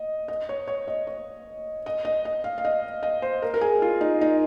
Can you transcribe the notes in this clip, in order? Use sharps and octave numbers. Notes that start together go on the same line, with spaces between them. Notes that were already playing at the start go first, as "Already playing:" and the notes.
Already playing: D#5
D#5
C#5
C#5
D#5
C#5
D#5
D#5
D#5
F5
F5
D#5
D#5
C5
A#4
A#4
G#4
F4
D#4
D#4